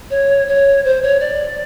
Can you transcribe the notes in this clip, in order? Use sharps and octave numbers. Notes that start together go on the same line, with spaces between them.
C#5
C#5
C5
C#5
D5